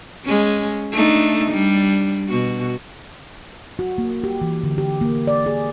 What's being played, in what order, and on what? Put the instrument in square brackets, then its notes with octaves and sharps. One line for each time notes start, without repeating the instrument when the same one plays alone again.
[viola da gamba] G#3 C#4
A3 D4 D#4
G3 D4
B2 F#4
[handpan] F#4
A#3
G4
E3
D3
G4
A#3
D5
G#4